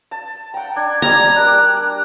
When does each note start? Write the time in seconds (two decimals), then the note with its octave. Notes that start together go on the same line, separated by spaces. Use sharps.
0.11 A5
0.54 F#5 G5 A#5
0.76 D4 G#6
1.02 G3 D5 D#5 A#5 G#6
1.36 D4 G4 A#4 F#6